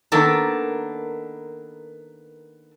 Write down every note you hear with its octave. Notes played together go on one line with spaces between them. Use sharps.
D#3 A#3 B3 D4 A4 A#4